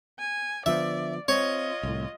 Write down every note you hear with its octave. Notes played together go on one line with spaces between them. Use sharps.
G#5
D3 F3 B3 D5 E5
C4 F4 C#5 D#5
C2 A2